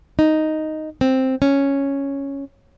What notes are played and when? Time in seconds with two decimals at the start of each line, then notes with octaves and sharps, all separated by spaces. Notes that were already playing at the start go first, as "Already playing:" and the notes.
0.19 D#4
1.01 C4
1.42 C#4